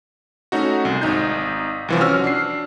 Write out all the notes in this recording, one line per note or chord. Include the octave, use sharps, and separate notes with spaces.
A3 C#4 D#4 F#4
C2
G#1 D#4 G6
C2 E3 F3
C#4 F#4 E6 F6
D4 C7